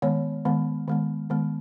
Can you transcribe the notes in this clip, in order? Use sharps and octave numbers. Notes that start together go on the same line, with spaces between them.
D#3 G#3 B3 C#5
D#3 G#3 B3
D#3 G#3 B3
D#3 G#3 B3